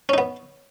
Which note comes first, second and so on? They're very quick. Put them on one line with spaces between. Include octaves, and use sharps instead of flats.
C#4 D#4 B3